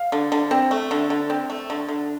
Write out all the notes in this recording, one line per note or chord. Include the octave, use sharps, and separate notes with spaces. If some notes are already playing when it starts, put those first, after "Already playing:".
Already playing: F5
D3
D3
C4
A3
D3
D3
C4
A3
D3
D3